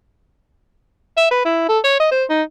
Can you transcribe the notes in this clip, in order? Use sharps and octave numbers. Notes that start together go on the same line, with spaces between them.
E5
B4
E4
A4
C#5
D#5
C5
D#4